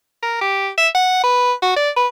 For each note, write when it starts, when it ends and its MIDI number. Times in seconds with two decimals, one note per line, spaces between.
0.23 0.36 70
0.41 0.69 67
0.78 0.88 76
0.95 1.19 78
1.23 1.52 71
1.62 1.73 66
1.76 1.90 74
1.96 2.07 71